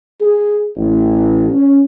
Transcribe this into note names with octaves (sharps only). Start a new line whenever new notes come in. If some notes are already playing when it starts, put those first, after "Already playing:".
G#4
A1
C#4